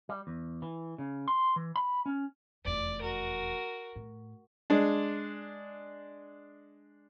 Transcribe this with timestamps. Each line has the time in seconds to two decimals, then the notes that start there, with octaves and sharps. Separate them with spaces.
0.09 G3
0.27 E2
0.62 E3
0.98 C#3
1.28 C6
1.56 E3
1.76 B5
2.06 C#4
2.65 F1 E2 D5
3.01 F#4 A#4
3.96 A2
4.70 G#3 D4